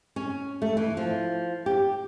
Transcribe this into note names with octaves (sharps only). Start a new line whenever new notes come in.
C#4
A3
E3
F3
G4